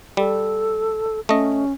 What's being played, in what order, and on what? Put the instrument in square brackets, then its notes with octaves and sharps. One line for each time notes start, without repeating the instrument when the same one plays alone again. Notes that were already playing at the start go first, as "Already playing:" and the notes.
[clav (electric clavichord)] G3 [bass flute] A4
[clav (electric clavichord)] A3 D#5 [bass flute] C#4